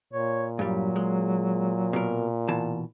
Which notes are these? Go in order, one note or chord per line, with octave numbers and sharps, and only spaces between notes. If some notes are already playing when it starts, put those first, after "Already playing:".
A#2 C#5
G2 F#3 G3
G#3
B2 A#4
B2 E3 A5